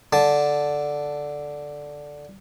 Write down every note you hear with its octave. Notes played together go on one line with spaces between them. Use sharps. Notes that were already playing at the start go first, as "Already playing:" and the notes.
D3 A5